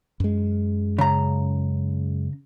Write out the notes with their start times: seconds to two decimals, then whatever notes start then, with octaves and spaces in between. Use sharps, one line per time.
0.20 F#2 G#3
0.99 C#3 A#5